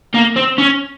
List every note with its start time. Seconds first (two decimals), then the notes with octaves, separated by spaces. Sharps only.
0.14 A#3
0.36 C4
0.58 C#4